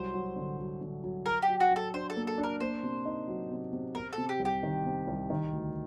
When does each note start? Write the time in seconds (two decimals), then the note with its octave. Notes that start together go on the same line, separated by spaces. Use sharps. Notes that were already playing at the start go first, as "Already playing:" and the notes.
Already playing: C2 F#3 C5
0.14 F#3
0.36 D3
0.59 F#3
0.81 D3
1.04 F#3
1.26 F#3 A#4
1.42 G4
1.48 F#3
1.60 F#4
1.71 F#3 A4
1.94 D4 C5
2.10 A4
2.16 A#3
2.27 A4
2.38 D4
2.43 A#4
2.60 A#3 C5
2.83 C3
3.05 D#4
3.28 F#3
3.51 C3
3.73 C3
3.95 C3 A#4
4.13 A4
4.18 C3
4.29 G4
4.40 C2
4.45 G4
4.63 D#3
4.85 C3
5.07 C2
5.30 D#3
5.52 D2